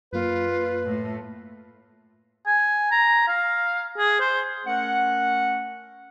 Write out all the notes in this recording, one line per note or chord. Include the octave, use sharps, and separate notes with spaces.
F#2 A#3 F4 B4
A2 A3
G#5
A#5
F5
G#4
C5
A3 C#4 A#4 F#5